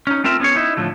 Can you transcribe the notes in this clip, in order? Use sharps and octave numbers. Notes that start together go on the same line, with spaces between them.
C#4 D#4
A3 C4 F4 A#4 E5
B3 C#4 F4 G#4 C#5
D#4 E4
A2 D3 F3 A3